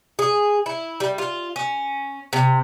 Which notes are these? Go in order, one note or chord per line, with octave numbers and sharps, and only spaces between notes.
G#4
E4
G3
F4
C#4
C3